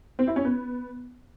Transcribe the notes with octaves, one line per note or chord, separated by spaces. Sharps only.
C4
E4
C#4
B3